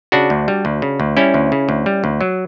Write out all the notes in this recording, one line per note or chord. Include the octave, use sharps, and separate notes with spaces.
C#3 D4 F#4
D2
G3
D2
C#3
D2
G3 C#4 E4
D2
C#3
D2
G3
D2
F#3